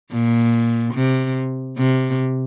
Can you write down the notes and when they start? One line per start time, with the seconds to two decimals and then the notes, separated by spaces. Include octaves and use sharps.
0.12 A#2
0.94 C3
1.77 C3